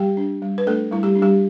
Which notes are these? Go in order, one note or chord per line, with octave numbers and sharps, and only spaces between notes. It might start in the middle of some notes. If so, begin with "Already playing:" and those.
Already playing: G3 G4 G5
D4
G3
B4
A3 D4 A4
G3 E4
G3 G4
D4
G3 G4